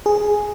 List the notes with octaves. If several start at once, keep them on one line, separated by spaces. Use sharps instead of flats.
G#4